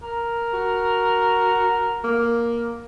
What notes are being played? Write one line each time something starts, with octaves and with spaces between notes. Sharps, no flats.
A#4
F#4
A#3